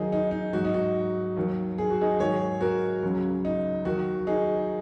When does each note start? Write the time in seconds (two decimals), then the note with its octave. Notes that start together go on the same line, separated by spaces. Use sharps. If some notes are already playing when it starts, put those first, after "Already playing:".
Already playing: D#2 D#3 F#3 D#4 G#4
0.12 D#4
0.31 D#4
0.53 G#2 F#3 F#4
0.65 D#4
0.74 F#4
1.37 D#2 D#3 F#3
1.78 G#4
1.90 F#4
2.01 D#4 G#4
2.19 G#2 D#3 F#3 G#4 C#5
2.61 F#4 A#4
3.02 C#2 C#3 F#3
3.45 D#4
3.85 D#2 D#3 F#3 F#4
4.27 D#4 G#4